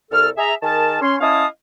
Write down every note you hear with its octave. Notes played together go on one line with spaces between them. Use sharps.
C2 A4 F6
G#4 E5 A#5
D#3 G#4 A#4 A5
C#4 C6
C#4 E4 D#5 F5 A5 D#6